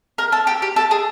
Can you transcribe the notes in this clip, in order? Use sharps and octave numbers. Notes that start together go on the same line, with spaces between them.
A#4
A4
G4
G4
A4
G#4